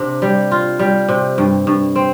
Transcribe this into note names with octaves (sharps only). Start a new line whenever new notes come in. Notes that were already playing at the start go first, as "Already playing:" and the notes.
Already playing: C3 D4
G3
F4
G3
C3
G2
G2
C4